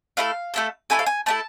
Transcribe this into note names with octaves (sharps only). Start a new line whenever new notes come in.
A3 E4 A4 F5
A3 E4 A4
A3 E4 A4 G#5
F5
G#5
A3 E4 A4 A5